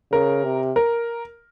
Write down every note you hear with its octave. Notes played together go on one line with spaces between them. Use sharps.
C#3 A#4
C3
A#4